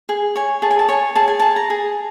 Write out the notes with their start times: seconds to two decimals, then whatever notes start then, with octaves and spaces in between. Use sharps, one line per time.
0.09 G#4
0.36 C#5 G#5
0.62 G#4 A5
0.71 G#5
0.79 A5
0.88 C#5 G#5
1.15 G#4 A5
1.28 G#5
1.39 G#4 A5
1.56 A#5
1.70 G#4